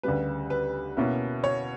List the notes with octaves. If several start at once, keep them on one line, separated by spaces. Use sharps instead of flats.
D2 C#3 G3 B4
B4
B2 A#3 C#4 E4
C#5